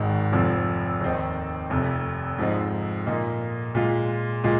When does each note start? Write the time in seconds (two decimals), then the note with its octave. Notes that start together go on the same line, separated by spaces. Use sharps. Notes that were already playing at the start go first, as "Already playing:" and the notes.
Already playing: G#1 G#2 D#3
0.32 F1 F2 F3 C4
1.01 D#2 D#3 C4 D#4
1.70 F1 F2 C3
2.38 G#2 F3 C4 D#4
3.07 A#2 A#3 D#4
3.75 A#2 G#3 F4
4.44 A#2 G#3 F4